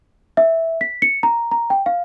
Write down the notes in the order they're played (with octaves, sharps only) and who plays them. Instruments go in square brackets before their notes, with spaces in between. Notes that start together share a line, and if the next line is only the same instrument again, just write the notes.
[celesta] E5
B6
C#7
A#5
A#5
G5
F5